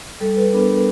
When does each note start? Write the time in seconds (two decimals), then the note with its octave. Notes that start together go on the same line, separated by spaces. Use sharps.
0.21 G3 A4
0.37 B4
0.53 B3 D4 A#4